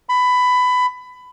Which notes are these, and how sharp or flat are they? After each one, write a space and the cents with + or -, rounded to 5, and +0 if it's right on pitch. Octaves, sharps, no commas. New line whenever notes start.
B5 +15